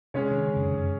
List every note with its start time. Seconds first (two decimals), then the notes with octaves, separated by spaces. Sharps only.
0.14 C3 G#3 C#4 G#4 C#5
0.31 D#3
0.48 C#3
0.56 F#2
0.65 F2
0.74 F#2